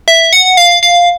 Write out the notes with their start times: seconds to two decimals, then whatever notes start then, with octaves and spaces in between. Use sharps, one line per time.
0.08 E5
0.33 F#5
0.57 F5
0.83 F5